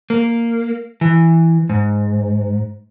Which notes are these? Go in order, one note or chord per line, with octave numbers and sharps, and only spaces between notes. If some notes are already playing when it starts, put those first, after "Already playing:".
A#3
E3
G#2